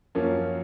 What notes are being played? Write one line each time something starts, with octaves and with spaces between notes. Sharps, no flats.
F#2 F3 A#3 C#4